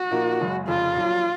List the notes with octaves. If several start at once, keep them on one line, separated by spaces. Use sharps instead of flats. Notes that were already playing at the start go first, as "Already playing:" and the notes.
Already playing: F#4
A#2 F3 A#3 D#4 A#4
F#1 F#2 C#3 G#3
F1 F2 C#3 F3 F4
A#1 A#2 F#3